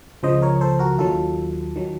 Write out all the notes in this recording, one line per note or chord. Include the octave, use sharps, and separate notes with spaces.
C#2 C#3 F3 C5 D#5
A#4 C#5
A4 C5
F#4 A#4
D#2 D#3 F#3 F4 A4
D#3 F#3